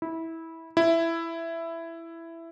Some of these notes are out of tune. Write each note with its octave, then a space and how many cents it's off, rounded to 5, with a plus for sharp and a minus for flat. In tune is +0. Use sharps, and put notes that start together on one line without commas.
E4 -15
E4 +10